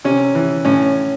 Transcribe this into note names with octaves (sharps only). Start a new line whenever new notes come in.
C3 C#4
E3
A2 C#4